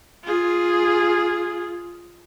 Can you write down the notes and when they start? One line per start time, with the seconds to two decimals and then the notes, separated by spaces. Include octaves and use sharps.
0.24 F4 G#4